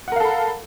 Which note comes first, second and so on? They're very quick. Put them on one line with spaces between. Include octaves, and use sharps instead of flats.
F#5 A#4 F5 A4 B5